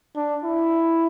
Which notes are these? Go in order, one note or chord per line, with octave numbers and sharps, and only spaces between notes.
D4
E4